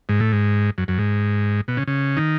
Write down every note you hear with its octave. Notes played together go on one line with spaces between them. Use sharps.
G#2
A2
G#2
F#2
F#2
G#2
B2
C#3
C#3
D#3